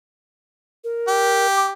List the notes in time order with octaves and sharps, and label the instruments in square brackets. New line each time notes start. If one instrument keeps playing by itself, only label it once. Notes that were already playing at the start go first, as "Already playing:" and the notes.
[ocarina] A#4
[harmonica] G4
[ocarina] D6